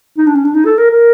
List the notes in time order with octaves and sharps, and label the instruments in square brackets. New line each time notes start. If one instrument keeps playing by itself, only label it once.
[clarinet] D#4
D4
C#4
D4
D#4
A4
A#4
A#4